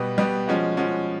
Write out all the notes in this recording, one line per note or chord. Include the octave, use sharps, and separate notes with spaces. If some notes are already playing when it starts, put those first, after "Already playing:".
Already playing: B2 G3 B3
B2 G3 B3
F3 G#3 C#4 F#4
F3 G#3 C#4 F#4